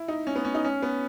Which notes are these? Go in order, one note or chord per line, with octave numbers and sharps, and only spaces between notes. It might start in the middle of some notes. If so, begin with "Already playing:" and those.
Already playing: E4
D#4
C#4
B3
C#4
D#4
C#4
B3